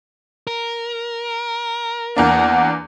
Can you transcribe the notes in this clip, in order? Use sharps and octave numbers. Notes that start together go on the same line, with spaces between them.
A#4
E2 A#3 D4 F#5